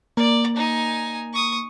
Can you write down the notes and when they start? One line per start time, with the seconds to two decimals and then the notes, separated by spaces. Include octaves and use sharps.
0.17 A#3 D5
0.56 D#4 G#5
1.33 C#6 D#6